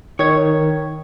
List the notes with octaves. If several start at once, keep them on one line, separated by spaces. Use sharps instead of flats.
D#3 C#5 G#6